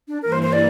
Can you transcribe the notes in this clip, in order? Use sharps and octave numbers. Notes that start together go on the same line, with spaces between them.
D4
G2 E3 A#3 A#4
C5
C5
D5